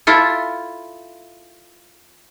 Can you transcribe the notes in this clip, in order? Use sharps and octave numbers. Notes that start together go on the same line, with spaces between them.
E4 F4 A4